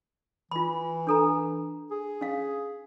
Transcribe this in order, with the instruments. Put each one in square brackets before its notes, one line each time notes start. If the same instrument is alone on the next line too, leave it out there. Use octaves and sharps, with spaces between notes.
[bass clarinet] E3 [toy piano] F4 B5
[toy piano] D4 A4 A#5
[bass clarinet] G#4
[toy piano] C#4 F5